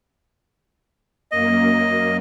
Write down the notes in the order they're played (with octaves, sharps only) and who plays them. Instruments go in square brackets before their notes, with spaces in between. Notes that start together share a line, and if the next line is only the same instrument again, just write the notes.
[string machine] F#2 A#3 [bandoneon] D#5